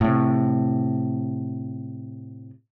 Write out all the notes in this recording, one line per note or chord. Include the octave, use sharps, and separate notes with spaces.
A2 C3